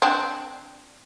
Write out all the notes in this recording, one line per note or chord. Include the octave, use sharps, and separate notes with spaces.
C4 D4